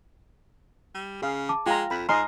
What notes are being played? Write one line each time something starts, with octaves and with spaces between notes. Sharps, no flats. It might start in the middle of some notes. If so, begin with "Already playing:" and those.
G3
C#3 G#4 F5
A5 D6
G#3 F4 G5 A#5
F2 B5
G#2 D#5 G#5 A#5 C6 F6